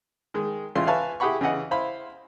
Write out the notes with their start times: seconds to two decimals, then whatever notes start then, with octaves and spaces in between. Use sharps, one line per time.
0.34 D#3 G#3
0.75 A1 C#3 E4 F4 F5 C6
0.87 B4 E5 F5 G#5 A5 C#6
1.20 E4 G4 G#4 F#5 B5 C#6
1.41 C#3 E3 D#5 F#5
1.71 E4 C5 F5 B5